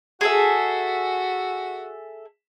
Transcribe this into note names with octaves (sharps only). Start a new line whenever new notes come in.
F#4 G#4 A4 E5